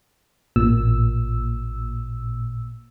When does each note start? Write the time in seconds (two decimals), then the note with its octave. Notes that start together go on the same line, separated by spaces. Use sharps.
0.56 A1 A#2 E6